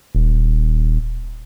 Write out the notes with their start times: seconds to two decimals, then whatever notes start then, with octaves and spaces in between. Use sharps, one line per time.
0.15 D#1